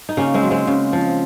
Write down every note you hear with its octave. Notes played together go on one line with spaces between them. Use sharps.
D#4
C#3 A#3 C#4
G#3 C4
F#3
G#3 C4
C#3
F3